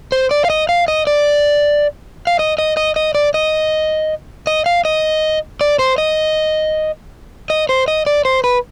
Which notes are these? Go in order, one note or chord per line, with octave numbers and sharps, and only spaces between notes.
C5
D5
F5
D#5
F5
D#5
D5
F5
D#5
D#5
D#5
D#5
D5
D#5
D#5
F5
D#5
D5
C5
D#5
D#5
C5
D#5
D5
C5
B4